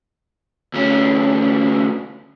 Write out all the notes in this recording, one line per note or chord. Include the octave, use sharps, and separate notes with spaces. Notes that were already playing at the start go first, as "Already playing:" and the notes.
D2 C#4